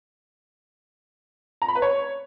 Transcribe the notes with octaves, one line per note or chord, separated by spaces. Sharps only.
A#5
B5
B4
C#5